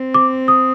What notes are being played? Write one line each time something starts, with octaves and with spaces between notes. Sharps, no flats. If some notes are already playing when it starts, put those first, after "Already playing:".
Already playing: C4
D6
D#6